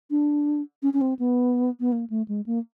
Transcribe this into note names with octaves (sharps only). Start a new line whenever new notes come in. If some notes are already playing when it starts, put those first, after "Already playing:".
D4
C#4
C#4
C4
B3
B3
A#3
A3
G#3
A#3